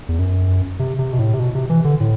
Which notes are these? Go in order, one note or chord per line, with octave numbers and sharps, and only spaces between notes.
E2
F#2
C3
C3
B2
A2
C3
B2
C3
E3
D3
A2